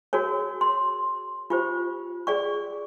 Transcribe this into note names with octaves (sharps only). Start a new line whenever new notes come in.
F#4 G#4 A#4 C#5
C6
F4 G4 C5
G#4 D5 C#6